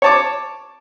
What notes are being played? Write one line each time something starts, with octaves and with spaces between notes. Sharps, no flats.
C#5 A5 D6